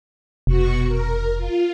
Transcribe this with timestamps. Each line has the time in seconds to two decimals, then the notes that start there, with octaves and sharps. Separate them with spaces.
0.47 F1 B2 F#4 C#6
0.87 A#4
1.38 F4